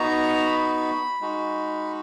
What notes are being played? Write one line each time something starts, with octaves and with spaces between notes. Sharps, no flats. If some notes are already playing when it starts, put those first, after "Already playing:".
Already playing: B3 D#4 F#4 A#5
B5
G#3 D#4 F#4